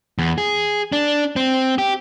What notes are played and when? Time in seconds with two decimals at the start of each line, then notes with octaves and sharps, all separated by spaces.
0.19 E2
0.38 G#4
0.92 D4
1.36 C4
1.78 G4